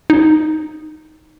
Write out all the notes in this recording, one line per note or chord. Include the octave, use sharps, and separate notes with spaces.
D#4